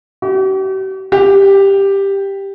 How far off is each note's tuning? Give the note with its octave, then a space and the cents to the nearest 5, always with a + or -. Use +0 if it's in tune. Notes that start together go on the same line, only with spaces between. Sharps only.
G4 -45
G4 +5